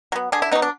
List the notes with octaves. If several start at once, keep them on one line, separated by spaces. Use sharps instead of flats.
F#3 B3
D3 G#4
E4
F#3 B3 D#4
D4